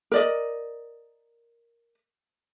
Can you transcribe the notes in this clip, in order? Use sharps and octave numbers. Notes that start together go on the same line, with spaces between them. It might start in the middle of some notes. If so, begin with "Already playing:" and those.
A#4 D5 D#5